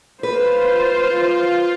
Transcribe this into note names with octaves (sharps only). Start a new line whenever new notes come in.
F4 B4 C5